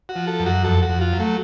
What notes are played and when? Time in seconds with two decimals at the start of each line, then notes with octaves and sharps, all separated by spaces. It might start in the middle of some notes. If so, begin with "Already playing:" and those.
0.09 F#4
0.16 F3
0.27 A4
0.40 F#2
0.46 F#4
0.64 F2 A4
0.82 F#4
0.89 F2
1.01 F4
1.13 F#3
1.20 A3